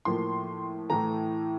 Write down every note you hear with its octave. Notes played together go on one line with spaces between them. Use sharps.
A2 F3 A#3 C6
A2 E3 A3 A#5